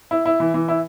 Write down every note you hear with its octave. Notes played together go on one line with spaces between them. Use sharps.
E4
E4
E3
E3
E4